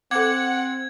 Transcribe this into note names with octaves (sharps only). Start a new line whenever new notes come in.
C4 A4 F#5 D6 G#6